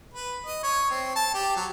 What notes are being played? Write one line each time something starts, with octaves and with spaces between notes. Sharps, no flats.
B4
D#5
C#5
C4
A5
G4
F#3